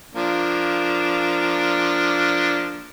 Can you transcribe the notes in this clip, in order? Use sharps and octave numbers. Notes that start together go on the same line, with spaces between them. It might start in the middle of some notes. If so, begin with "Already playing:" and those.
F3 A#3 D4